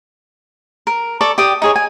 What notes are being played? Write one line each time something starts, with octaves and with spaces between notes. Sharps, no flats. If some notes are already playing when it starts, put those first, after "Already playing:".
A#4
A4 D5 C#6
G4 D5 D#6
D#4 G#4 C#5
G#5